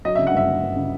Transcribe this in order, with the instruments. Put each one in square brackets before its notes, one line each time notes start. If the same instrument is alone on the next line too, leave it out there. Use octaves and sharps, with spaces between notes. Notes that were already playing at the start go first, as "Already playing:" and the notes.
[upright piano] F#3 D#5
E5
C#3
F#5
G1 E5
G1
G1
C#3